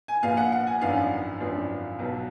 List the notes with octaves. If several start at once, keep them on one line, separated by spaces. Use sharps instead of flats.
G#5
A#1 A#2 F3 B3 F5
F#5
F#5
G#5
G#1 F#2 F3 B3 D4 F5
G#1 F#2 F3 B3 D4
B1 B2 F#3